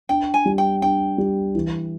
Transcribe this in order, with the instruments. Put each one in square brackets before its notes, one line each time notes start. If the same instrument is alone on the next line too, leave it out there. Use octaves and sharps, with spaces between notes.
[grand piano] D4 [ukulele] G5
[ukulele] G#5
[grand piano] G3
[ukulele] G5
[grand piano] D4 [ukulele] G5
[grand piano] G3
E3